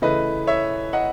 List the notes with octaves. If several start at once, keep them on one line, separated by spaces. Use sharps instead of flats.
C#3 E3 A3 B4 D#5
C#5 E5
D#5 F#5